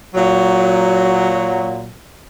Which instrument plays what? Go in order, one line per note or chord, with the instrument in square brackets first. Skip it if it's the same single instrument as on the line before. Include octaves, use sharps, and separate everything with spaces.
[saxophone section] A#2 F#3